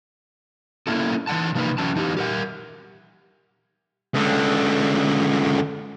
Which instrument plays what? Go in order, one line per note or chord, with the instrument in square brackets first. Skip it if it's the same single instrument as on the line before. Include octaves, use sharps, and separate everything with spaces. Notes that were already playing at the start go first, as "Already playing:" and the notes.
[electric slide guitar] A#3 C#4 E4 A4
E3 A3 F#5 A5
C3 F3 A#3 D#4 B4
E3 F#3 C#4 A5
E3 D#4 F#4 G4
G4 A#4 F#5
[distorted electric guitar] C#2 D3